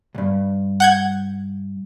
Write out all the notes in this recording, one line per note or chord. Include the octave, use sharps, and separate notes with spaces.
C2 G2
F#5 G6 G#6